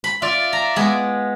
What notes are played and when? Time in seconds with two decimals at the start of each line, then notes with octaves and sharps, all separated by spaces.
0.04 B5
0.22 F4 D5 E5
0.53 A#5
0.76 G#3 B3